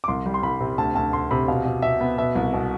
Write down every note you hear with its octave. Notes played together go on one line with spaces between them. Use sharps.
D6
C2 C6
G3
C6
C2 B5
C3
D2 A5
D2 A5
D2 C6
C3 B5
B2 F5
B2
B2 E5
B3
B2 E5
C2
B2